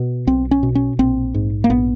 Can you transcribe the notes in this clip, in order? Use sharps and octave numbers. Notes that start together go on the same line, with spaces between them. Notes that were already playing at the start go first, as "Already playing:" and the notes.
Already playing: B2
B1 C4
C#4
B2
C#4
A#1 C4
G#2
A#3
A#1 B3